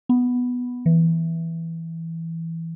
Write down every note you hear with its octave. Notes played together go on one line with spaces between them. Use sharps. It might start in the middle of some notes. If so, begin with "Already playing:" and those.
B3
E3